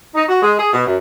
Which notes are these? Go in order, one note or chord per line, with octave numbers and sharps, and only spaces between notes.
D#4
F#4
G#3
G#4
B2
F#2